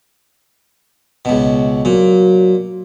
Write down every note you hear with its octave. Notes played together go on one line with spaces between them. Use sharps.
C#2 B2
A#2 F#3